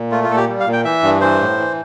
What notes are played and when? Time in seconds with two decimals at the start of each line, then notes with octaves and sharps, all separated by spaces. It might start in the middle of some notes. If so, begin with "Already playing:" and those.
Already playing: A#2
0.11 A3 F4
0.24 F4
0.29 A#2 A4
0.37 G4
0.48 G3
0.60 F5
0.67 A#2
0.73 G5
0.84 E3 E5
1.03 G2
1.21 E3 C5
1.40 A2
1.58 E3